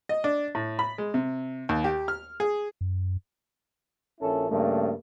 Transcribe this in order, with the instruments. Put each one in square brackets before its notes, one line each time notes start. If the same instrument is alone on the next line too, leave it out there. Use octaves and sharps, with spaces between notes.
[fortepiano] D#5
D4
A2
B5
G#3
C3
D#2
G4
F6
G#4
[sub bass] F#2
[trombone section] A#1 A#3 C#4 E4 A4
G2 C#3 A3 A#3